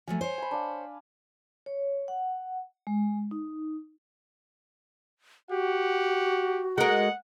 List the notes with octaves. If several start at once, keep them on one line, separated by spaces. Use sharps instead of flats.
F3 F#3 A3 G#5
C5 C#5
G#5 B5
D4 F5
C#5
F#5
G#3
D#4
F#4 G4 F#5
G#3 A#4 F#5